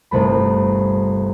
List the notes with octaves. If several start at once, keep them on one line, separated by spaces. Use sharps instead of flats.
G1 C2 C3 A3 B5